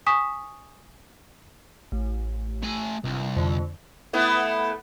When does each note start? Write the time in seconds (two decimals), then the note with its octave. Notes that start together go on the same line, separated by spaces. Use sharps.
0.06 G#5 C#6 D#6 B6 E7
1.92 A1
2.63 A3 G#5
3.04 G1 C2
3.36 F2 D3
4.13 A3 B3 E4